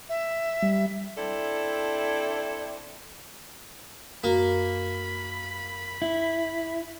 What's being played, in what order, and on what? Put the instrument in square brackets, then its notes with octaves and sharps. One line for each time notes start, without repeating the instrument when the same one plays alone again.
[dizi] E5
[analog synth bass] G3
[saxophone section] C4 D4 E4 A4
[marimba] F#2 F#4 [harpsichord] A#3 [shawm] B5
[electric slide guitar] E4